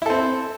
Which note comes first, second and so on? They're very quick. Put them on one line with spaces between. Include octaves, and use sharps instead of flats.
E4 A4 C4